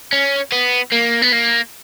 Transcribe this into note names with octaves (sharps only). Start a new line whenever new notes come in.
C#4
B3
A#3
B3
A#3